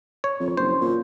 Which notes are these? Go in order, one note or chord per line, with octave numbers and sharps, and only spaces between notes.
C#5
F2
F#1 C5
A#2